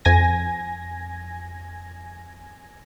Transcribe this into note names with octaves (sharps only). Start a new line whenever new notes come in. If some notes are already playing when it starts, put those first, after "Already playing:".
F2 G#5 G#6 A#6